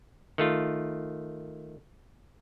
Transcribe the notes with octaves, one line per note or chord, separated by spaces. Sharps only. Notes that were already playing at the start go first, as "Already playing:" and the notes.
D#3 A3 F4